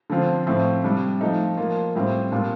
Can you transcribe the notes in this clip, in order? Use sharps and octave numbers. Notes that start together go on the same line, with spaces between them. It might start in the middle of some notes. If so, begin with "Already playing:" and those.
D3 F3 C4 F4
A2 F3 C4
C3 G3 D4
F3 A3 D#4
F3 A#3 F4
A2 G3 C4 F4
A#2 G3 D4 F4